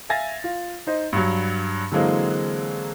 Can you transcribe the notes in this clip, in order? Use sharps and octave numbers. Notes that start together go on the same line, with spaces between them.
E5 F5 G#5 A6 A#6
F4
D#4 C5 D#5
G2 F#3
D3 E3 F#3 G#3 A#3 C4